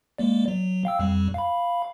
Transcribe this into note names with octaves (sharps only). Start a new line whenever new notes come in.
G#3 A#3 D5
F#3
F5 G5 E6
F2 G3
F5 B5